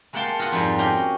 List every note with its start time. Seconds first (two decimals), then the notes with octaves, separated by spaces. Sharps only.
0.13 G#3 A#3 F#5 G5 A5 C6
0.39 F4 D#5 F5 F#5
0.52 F2 G#2 F3 G3
0.78 C#4 F#4 G4 A#5 C6